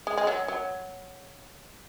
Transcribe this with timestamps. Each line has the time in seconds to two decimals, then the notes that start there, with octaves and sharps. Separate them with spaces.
0.07 G#3
0.17 G#3
0.27 F#3
0.48 F#3